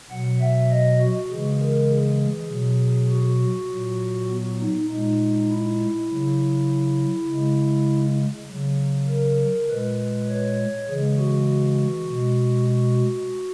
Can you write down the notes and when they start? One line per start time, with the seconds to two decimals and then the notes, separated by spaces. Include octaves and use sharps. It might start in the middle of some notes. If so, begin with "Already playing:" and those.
0.10 B2 F#3 F#5
0.39 E5
0.70 D#5
0.99 F#4
1.30 C#3 E3 G#3 G#4
1.60 A#4
1.89 G#4
2.49 B2 F#3
3.10 F#4
3.69 A#2 F#3
4.29 B3
4.59 D#4
4.89 A#2 G#3 D#4
5.49 E4
6.09 C#3 F#3
7.28 C#3 G#3
8.48 C#3 F#3
9.07 A#4
9.68 A#2 G#3 B4
10.28 C#5
10.88 C#3 E3 G#3 G#4
11.17 F#4
12.07 B2 G#3
12.67 F#4